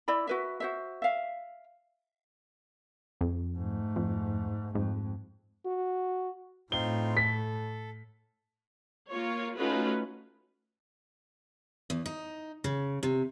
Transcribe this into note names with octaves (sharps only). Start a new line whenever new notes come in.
E4 D5 B5
F#4 B4 E5
F#4 C5 E5
E5 F5
F2
G#2 A3
F2
F2 G#2
F#4
A2 C4 D#4 F4 G7
A4 B6
A#3 F4 C#5
A3 C#4 D#4 F4 F#4 B4
E2
D#4
C#3
C3